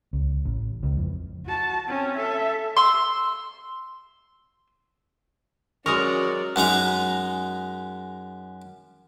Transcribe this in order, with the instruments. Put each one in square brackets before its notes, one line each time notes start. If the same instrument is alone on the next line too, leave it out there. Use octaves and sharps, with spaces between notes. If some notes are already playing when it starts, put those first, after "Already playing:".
[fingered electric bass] C#2
A1
C#2
F2
[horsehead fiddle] F#4 A5
C4 C#4
A4 E5
[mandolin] C6 E6
[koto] F#3 G#3 A#4 [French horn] C#4 [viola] F#4 D5 [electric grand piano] C#6 D#6
[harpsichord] F#2 G#3 D#4 A#5